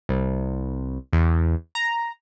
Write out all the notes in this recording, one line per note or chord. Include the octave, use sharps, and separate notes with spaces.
C2
E2
A#5